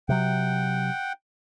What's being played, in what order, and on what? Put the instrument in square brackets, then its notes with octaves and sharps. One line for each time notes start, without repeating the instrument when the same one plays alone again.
[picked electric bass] C3 F#3 [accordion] F#5 G5